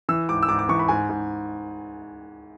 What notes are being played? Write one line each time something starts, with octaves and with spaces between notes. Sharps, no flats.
E3 E6
G#2 D6
E6
G#2 D6
D6
E3 C#6
B5
G#2 G#5
G#2